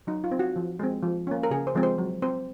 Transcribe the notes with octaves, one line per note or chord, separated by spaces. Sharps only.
F#3 D#4
F4
C4
F#4
F3
G#3 C4
F3
A#3 C#4
A#4
C#3 G#4
C5
F3 G#3 C4
C5
F#3
C4 C5